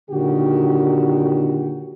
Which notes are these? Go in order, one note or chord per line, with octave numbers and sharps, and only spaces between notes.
A#2 D3 D#3 F#3 F#4 G4